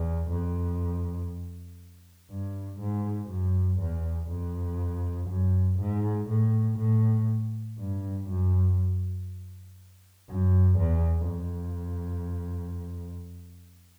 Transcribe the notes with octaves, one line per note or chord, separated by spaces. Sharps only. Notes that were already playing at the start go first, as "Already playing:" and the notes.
Already playing: E2
F2
G2
G#2
F#2
E2
F2
F#2
G#2
A2
A2
G2
F#2
F#2
E2
F2